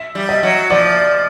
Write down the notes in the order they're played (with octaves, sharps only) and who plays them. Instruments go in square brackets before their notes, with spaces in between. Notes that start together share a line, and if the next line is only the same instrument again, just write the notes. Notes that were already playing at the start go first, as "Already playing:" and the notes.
Already playing: [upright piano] E5
[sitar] G3
[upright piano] D#5
[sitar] F#3
[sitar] F3 [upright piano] D5